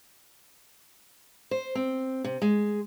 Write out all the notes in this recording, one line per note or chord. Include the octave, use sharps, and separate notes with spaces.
C5
C4
C3
G#3